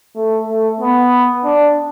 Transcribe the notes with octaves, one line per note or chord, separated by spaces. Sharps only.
A3
A3
B3
D4